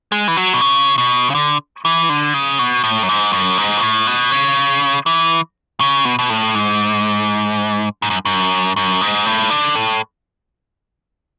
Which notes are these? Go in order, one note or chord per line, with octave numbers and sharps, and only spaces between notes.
G#3
E3
F#3
B2
C#3
B2
C#3
D3
E3
D3
C#3
B2
A2
F#2
G#2
F#2
G#2
B2
A2
B2
C#3
E3
C#3
B2
B2
A2
G#2
G#2
F#2
F#2
F#2
G#2
A2
D3
A2